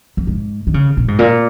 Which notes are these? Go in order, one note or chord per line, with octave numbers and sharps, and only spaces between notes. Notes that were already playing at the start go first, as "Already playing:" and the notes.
F2
G#2
D#3
C#3
A#2
G#2
A#2